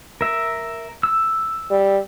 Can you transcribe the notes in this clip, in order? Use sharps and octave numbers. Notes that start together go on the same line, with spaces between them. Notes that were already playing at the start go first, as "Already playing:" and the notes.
A#4 E5
E6
G3